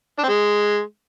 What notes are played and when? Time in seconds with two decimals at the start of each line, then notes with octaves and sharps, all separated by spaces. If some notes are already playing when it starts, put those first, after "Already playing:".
0.19 D4
0.24 C4
0.29 G#3